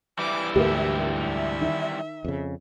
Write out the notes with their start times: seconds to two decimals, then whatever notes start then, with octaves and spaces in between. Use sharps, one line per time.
0.19 E3 G3 E4 D6
0.56 D2 G#2 D3 A#3 G4 E5
1.21 E5 F7
1.61 D#3
2.25 F2 C#3